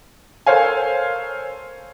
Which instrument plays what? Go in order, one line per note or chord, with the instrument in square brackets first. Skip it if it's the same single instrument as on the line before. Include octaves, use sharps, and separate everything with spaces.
[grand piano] A4 A#4 C5 C#5 F5 G#5